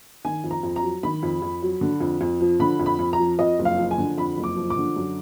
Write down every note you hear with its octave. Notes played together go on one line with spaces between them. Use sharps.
D#3 G#5
F2
A#5
F2
A#5
F#3
D#3 B5
F2
F2
F#3
D3
F2
F2
F3
D3 B5
F2
B5
F2
A#5
F3
F2 D#5
F#1
F5
F3
G#5
D3
F2 B5
F#1
D6
F3
D6
D3
F#2